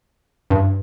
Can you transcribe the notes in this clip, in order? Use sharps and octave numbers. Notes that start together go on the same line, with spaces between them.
G2